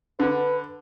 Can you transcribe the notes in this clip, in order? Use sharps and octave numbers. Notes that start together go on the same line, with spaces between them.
D3 B4